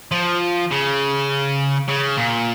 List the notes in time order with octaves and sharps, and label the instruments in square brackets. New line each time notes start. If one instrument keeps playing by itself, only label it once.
[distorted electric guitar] F3
C#3
C#3
A#2